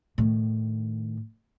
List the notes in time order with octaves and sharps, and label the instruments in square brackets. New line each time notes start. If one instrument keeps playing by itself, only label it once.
[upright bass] A2 D#3